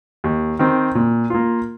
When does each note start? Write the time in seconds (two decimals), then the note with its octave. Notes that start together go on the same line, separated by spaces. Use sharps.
0.24 D#2
0.59 D#3 C4
0.95 A#2
1.30 A#3 F4